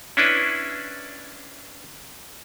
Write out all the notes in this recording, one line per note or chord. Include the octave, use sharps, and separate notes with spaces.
C#4 D4 E4 B4